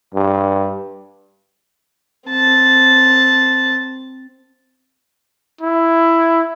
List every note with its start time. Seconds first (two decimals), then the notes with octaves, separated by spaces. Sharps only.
0.14 G2
2.29 C4 A5
5.61 E4